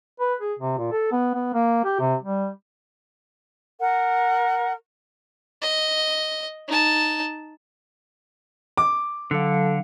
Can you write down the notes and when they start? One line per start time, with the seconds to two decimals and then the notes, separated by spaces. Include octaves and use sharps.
0.20 B4
0.40 G#4
0.59 C3
0.78 A#2
0.92 A4
1.12 B3
1.34 B3
1.54 A#3
1.84 G4
1.99 C3
2.22 G3
3.80 A#4 F#5
5.62 D#5
6.68 D#4 A5
8.77 D6
9.31 D3 F#3 A4 F5